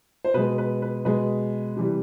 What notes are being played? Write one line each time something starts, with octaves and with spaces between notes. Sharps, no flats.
C5
B2 G#3 B4
B4
B4
B2 G#3 B4
C3 E3 G3